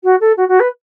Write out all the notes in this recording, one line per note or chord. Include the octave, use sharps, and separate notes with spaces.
F#4
A4
F#4
F#4
B4